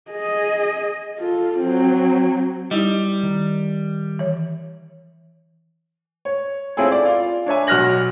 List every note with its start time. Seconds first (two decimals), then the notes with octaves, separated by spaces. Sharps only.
0.11 G#4 D#5
1.18 F4 A4
1.59 F#3 C4
2.71 G3 D#4 E4 D#5
3.23 D#3
4.19 E3 C#5
6.25 C#5
6.77 C4 C#4 E4 F4 G#4 A4
6.92 D5
7.05 F4
7.46 D4 C#5 E5 G#5
7.67 B1 F#4 F6 F#6 A#6 F#7